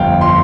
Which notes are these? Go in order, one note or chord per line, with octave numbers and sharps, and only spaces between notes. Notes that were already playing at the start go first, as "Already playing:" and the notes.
Already playing: G1 F2 F5 G5
C6